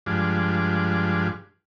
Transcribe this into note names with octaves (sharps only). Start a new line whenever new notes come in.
G2 F3 G#3 D4